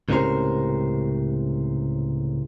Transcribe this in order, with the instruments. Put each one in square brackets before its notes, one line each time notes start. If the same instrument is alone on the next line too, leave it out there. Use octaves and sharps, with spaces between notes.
[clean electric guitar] C#2 A2 C3 C#4 A#4 C5